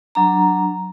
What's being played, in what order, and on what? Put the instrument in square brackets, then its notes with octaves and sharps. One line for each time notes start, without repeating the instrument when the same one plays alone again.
[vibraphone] F#3 D4 A#5